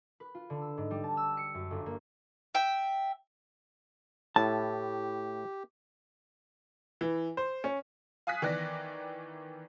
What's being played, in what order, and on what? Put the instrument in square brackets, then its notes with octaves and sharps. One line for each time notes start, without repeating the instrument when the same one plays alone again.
[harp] B4
F4
D3
E6
G#2
G3
A5
E6
C#7
F#2
G1
A#3
[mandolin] E5 G5
[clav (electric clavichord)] A2 E4 [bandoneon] G4 [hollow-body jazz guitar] A5
[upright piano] E3
C5
C#4
[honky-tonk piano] F5 G#5 D#6 F#6 B6
D#3 E3 B3 D5 F#6 A#6